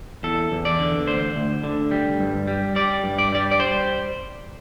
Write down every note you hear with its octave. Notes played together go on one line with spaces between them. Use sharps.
E2 A4
E2
D5
D3
D2 C5
D2
D3
G3
G2
G3
G3 D5
G2
D5
G3 D5
D5
C5